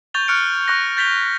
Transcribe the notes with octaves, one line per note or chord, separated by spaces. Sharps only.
C#6 G6 A6 F7 G7
C#6 F6 F#6 C#7 D7
C#6 F#6 A#6
G6 A6 B6 F7 G7